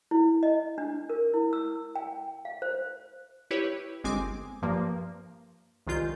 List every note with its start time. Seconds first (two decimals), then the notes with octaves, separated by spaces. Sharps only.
0.11 E4
0.43 D#5
0.78 D4
1.10 A#4
1.34 E4
1.53 E6
1.96 G5
2.45 F5
2.62 C5
3.51 E4 G4 B4 C#5
4.04 G1 G#3 C4 G#5 D6
4.62 G2 F3 A#3
5.87 C2 D#3 G#3 F4 G6